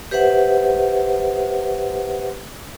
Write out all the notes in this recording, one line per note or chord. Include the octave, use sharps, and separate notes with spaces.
G4 B4 C5 E5 F#5